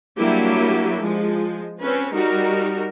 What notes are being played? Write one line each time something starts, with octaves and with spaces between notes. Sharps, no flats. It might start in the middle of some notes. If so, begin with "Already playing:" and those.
F#3 G3 A#3 D4 E4 G4
F3 G#3
C4 C#4 B4
G3 D#4 F#4 A#4